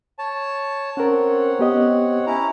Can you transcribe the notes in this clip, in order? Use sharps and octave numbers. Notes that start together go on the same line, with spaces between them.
C#5 A5
C4 C#4 A#4 C#5 F#5
B3 G4 D#5
C#4 E4 A#5